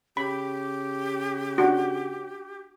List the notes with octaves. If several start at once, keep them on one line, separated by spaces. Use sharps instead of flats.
C#3 G4 B5
D4 F#4